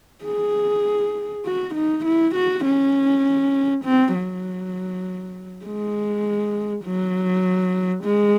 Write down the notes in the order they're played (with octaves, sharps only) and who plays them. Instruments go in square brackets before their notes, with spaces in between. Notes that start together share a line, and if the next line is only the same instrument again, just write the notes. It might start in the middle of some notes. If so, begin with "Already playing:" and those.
[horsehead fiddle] G#4
F#4
D#4
E4
F#4
C#4
C4
F#3
G#3
F#3
G#3